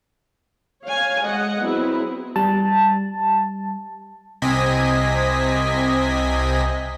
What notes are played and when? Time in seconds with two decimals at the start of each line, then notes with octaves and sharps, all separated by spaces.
0.83 C#5 F5 G#5
1.21 G#3 D#5 F#5
1.60 F#3 B3 C4 E4 G#4
2.36 G3 A5
4.42 C2 C3 C4 D#5 G#5 B6